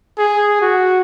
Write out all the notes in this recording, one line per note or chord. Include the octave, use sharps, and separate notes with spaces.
G#4
F#4